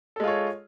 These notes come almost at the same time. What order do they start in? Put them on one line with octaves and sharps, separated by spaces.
A4 G#3 F4 C#5